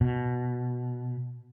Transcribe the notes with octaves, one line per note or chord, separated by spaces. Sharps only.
B2